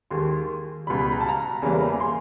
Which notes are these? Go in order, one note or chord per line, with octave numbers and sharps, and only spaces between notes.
D#2 D#3 G#3 C6
C#2 B2 G3 B5
B5
A#5
A5
A#5
E2 C#3 E3 G3 A#3
C6